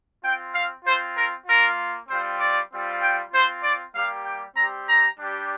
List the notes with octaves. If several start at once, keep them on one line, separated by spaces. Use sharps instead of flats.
C4 F4 G5
F5
C4 F4 C5
A#4
A#3 F4 A#4
G3 C4 F4 C5
D5
G3 C4 F4
G5
C4 F4 C5
D5
G3 A#3 G4 F5
G5
G3 C4 G4 A#5
A#5
G3 D4 G4